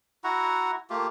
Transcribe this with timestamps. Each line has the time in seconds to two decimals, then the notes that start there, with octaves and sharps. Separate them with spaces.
0.24 E4 F#4 F#5 A#5
0.90 A3 A#3 F4 G4